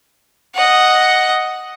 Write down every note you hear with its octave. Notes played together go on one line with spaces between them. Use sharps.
D#5 F#5